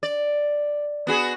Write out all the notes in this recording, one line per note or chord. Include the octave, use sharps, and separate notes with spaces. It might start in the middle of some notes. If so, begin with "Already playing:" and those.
D5
B3 F#4 G#4